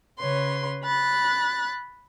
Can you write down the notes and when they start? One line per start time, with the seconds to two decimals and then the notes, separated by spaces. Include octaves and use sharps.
0.20 C#3 B4 C#5 C6
0.84 B5 F#6 A6